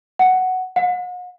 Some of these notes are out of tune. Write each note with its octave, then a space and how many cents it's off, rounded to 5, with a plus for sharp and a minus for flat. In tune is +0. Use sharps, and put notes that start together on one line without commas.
F#5 +5
F#5 -40